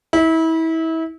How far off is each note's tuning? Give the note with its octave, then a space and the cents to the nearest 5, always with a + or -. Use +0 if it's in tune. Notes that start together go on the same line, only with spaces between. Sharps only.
E4 -30